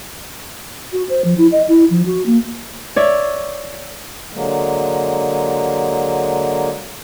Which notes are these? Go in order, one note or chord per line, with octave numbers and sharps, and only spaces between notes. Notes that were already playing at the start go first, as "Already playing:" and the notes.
F#4
C5
F3
E4
D#5
E4
F3
F#4
A#3
C#5 D5 E5
D3 F#3 G#3 A#3